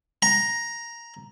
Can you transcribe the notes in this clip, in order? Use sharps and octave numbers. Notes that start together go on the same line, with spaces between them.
A#5